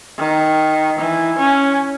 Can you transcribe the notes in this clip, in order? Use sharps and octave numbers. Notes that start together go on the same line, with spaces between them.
D#3
E3
C#4